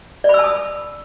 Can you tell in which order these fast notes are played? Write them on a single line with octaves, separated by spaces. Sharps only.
D5 B5 E6 A5 D#6